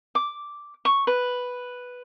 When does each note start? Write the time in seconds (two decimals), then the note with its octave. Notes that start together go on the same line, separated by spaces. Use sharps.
0.15 D6
0.85 C#6
1.07 B4